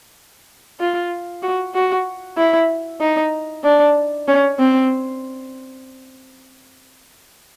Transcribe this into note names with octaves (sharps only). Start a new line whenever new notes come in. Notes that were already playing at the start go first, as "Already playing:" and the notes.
F4
F#4
F#4
E4
D#4
D4
C#4
C4